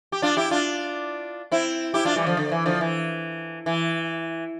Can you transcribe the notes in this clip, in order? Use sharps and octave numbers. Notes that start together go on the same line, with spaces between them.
G4
D4 F4
E4 G4
D4 F4
C4 E4
E4 G4
D4 F4
E3 G3
D3 F3
D3
E3
D3 F3
E3
E3